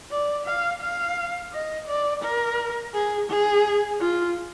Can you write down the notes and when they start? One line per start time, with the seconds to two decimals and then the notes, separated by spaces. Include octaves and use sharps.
0.11 D5
0.46 F5
0.82 F5
1.52 D#5
1.88 D5
2.23 A#4
2.94 G#4
3.29 G#4
4.01 F4